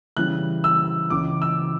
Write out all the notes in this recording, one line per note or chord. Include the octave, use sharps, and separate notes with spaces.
C#3 E3 G3 F#6
E6
C#2 C#3 E3 D6
E6